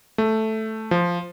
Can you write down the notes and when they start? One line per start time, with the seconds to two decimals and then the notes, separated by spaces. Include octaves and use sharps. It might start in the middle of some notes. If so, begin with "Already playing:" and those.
0.18 A3
0.91 F3